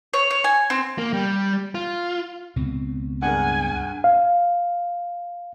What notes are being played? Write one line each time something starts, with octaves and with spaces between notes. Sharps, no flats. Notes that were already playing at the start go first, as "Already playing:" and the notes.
C#5
C#5
G#5
C4
A#3
G3
F4
C#2 B2 C4
G2 G#4 A#4 F#5 G#5
F5